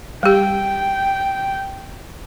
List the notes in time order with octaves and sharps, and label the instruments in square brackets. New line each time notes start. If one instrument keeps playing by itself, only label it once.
[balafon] G3 G4 [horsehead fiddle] G5